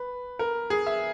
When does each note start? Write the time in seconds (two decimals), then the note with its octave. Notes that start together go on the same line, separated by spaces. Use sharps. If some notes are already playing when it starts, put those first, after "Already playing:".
Already playing: B4
0.39 A#4
0.70 G#4
0.86 E5